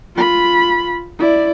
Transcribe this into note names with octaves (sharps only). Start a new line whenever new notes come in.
F4 B5
E4 D5